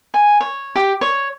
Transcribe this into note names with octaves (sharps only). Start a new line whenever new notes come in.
G#5
C#5
G4
C#5